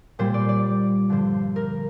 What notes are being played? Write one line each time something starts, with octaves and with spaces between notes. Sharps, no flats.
A#2 G3 C5
D5
D5
G2 D3 F3 C5
A#4